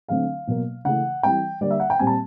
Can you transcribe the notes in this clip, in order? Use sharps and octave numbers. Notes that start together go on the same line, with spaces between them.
D3 F#3 A3 C4 F5
B2 F#3 A#3
C#3 E3 A3 F#5
E3 G3 C4 G5
D3 G3 A#3 D5
E5
F#5
G5
A#2 G3 C4 G#5
A5